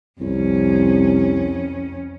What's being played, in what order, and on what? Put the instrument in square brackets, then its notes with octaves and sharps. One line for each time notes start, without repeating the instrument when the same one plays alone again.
[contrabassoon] C2 [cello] F2 C#4